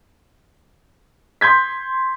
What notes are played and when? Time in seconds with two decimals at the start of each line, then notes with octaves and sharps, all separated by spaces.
1.41 C6 G6 G#6 B6